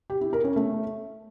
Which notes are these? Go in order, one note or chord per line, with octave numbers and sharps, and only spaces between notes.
G4
E4
A#4
C#4
A3